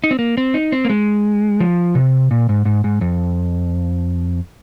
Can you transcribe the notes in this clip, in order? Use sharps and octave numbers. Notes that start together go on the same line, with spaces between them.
D#4
C4
A#3
C4
D#4
C4
A#3
G#3
F3
C3
A#2
G#2
G#2
G#2
F2